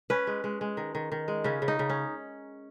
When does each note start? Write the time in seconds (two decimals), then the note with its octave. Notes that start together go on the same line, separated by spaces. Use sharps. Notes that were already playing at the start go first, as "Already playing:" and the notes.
0.10 C#4 B4
0.27 G#3
0.44 G#3
0.61 G#3
0.77 D#3
0.95 D#3
1.12 D#3
1.28 G#3
1.44 C#3 C#4
1.62 C#3
1.68 D#4
1.79 C#3
1.90 C#4